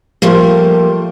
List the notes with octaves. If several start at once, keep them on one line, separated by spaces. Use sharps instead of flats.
F3 G3 A3 A#3